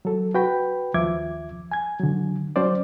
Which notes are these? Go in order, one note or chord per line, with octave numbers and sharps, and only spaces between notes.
F#3 A4
F#4 B4 G5 B5
D#2 F3 E5 D6 G#6
G#5 G#6
D3 F#3
F#3 C#4 C5 D5